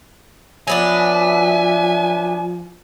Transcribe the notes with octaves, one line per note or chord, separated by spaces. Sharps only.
F3 F#3 B3 D4 E5 G#5